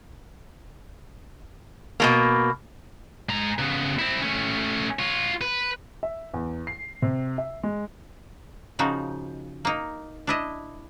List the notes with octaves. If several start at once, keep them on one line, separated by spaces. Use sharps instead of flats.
B2 A3 A#3
G#3 A#5
C#3 B3
C4 E4
A3 C#4
F4 C#5
B4
E5
E2
C7
C3
E5
G#3
C#3 F3 D#4 F#4
A#3 D#4
D4 E4 D#5